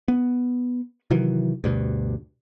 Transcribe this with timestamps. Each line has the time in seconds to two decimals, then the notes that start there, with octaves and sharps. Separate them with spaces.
0.08 B3
1.10 C3 D#3 E3 F#3
1.64 D2 G2 B2